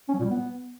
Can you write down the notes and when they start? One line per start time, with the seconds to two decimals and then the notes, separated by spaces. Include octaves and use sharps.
0.09 C#4
0.14 F#3
0.19 A#2
0.25 G3
0.30 B3